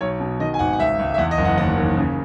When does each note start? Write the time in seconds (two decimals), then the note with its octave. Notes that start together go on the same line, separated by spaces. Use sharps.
0.01 B1 C#5
0.20 B2
0.39 D#3 D#5
0.54 G#5
0.59 G#1 F#5
0.73 F#5
0.79 C#2 E5
0.99 C#2
1.14 E5
1.18 E2 F#5
1.31 D#5
1.38 F#1
1.45 F#5
1.58 D#2 F#5
1.77 D#2
1.97 C#3